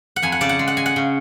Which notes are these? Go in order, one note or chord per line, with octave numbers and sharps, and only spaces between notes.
F#5
F2 G#5
F#5
C#3 D5
F#5
G#3
F#5
G#3 G#5
F#5
C#3